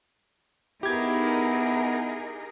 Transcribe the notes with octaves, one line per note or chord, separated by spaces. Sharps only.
B3 D#4 E4 G4 G#4 A#4 G#6